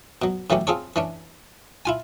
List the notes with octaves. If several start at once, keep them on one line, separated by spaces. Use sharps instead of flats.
B2 F#3
A2 E3 F#3 C#4 G4
C4 F4 G#4 A4 C#5
E3 C#4 D4
E4 F4 G#5